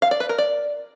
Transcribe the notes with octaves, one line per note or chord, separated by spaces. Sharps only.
F5
D5
B4
A#4
D5